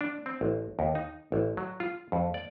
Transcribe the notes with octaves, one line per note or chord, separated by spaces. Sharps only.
D4
C4
A1
D#2
D#4
A1
F#3
F4
F2
D5